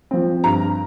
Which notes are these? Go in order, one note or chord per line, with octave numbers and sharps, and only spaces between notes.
F3 C4
G2 A#5